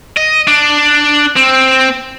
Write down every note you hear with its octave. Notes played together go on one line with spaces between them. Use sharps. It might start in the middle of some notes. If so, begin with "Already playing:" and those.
D#5
D4
C4